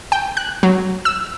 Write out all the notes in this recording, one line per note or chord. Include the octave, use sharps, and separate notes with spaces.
G5
F#6
F#3
E6